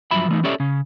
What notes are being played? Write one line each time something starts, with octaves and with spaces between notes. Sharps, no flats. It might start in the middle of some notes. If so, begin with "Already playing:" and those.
G2 F3 F#3 E5 B5
E3 A3 D#4
C#4 G4 A4 C#5 D5 E5
C#3 C#4